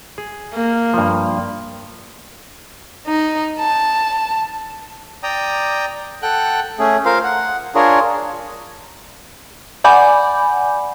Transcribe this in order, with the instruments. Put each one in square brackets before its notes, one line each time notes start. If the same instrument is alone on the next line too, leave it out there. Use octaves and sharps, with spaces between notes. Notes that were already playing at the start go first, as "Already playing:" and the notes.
[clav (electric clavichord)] G#4
[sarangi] A#3
[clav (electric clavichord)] G2 F3
[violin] D#4
A5
[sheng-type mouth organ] D5 G5 A#5 D#6
A4 F#5 G5 F#6
A3 C#4 G#4
F4 A#4 C5 F5
F#5
D4 F4 G#4 A#4 C#5
[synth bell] D5 F#5 G#5 B5 D6 G6